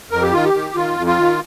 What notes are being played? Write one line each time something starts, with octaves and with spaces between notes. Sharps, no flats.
F2 A#4
G4
D#3 F4
G4
D#3
D#3 F4
F2
F4
D#3